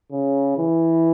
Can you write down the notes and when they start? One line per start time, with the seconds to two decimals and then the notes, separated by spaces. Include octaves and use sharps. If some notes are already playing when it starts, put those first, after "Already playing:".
0.12 C#3
0.57 E3